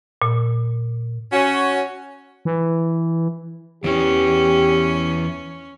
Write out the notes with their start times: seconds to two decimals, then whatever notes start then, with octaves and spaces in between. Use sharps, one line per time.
0.22 A#2
1.33 C#4 F#4
2.45 E3
3.84 E2 E3 C#4 G4